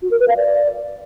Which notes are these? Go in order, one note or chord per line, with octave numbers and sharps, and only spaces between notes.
F#4
A#4
B4
F5
D5